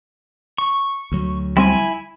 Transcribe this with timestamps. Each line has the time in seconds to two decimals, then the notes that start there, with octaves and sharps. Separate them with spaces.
0.58 C#6
1.12 D2 F#3
1.57 G3 C4 E4 G#5